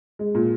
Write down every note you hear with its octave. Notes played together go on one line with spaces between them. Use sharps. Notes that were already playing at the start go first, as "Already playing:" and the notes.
G#3
A#2